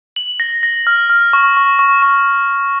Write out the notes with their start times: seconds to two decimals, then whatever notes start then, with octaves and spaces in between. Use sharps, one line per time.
0.16 F#7
0.40 A#6
0.63 A#6
0.87 F6
1.10 F6
1.33 C#6
1.57 C#6
1.79 C#6
2.02 C#6